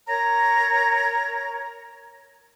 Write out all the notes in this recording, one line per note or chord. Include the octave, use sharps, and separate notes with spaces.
A#4 C#5 A#5